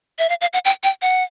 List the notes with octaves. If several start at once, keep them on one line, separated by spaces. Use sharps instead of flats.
E5
F5
F5
F#5
G5
G5
F#5